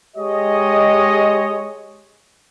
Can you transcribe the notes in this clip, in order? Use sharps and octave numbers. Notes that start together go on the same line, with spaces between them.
G#3 G4 C#5 D#5